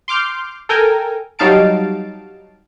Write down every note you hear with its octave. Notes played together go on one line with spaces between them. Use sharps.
C6 D6 F6 G6
A4 A#4 G5 G#5
F#3 G3 D#4 F5 A5 D7